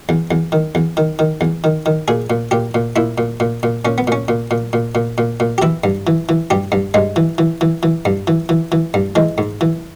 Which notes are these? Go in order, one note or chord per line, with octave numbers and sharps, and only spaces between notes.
E2
E2
D#3
E2
D#3
D#3
E2
D#3
D#3
A#2 G#4
A#2
A#2 G4
A#2
A#2 E4
A#2
A#2
A#2
A#2 C#4
B3
A#2 C#4
A#2
A#2
A#2
A#2
A#2
A#2
G4
E3 E4
G2
E3
E3
G2 G4
G2
G2 G#3
E3
E3
E3
E3
G2
E3
E3
E3
G2
E3 G#3
G#2
E3